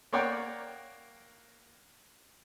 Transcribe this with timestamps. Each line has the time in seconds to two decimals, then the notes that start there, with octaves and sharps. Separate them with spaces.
0.13 A#3 A#4 C#5 D5 F#5 G5